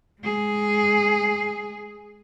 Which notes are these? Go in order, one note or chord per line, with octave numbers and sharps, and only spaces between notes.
G#3 G#4